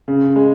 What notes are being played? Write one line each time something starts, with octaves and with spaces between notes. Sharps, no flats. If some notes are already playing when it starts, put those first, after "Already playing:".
C#3
G#3